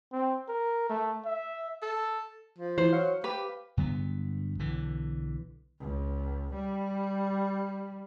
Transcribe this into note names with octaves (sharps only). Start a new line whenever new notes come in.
C4
A#4
A3
E5
A4
F3
E3 C5
F#3 F5
G4 B4
G2 D3 F#3 B3
B1 D3 E3
C#2
G3